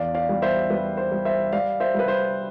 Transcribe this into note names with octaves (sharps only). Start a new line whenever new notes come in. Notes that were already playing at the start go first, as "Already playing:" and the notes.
Already playing: E2 D5 F5
D5 F5
G3
C5 E5
G3 B4
C5
G3
C5 E5
G3 D5 F5
C5 E5
G3 B4
C5